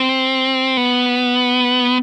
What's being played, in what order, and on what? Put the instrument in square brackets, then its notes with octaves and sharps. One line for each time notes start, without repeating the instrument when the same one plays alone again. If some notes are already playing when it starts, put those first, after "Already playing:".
Already playing: [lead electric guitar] C4
B3